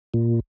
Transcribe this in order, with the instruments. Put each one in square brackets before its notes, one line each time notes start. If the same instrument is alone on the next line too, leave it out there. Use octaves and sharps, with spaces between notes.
[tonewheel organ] A#2